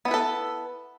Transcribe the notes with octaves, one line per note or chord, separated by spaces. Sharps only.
B3 E4 A4 B4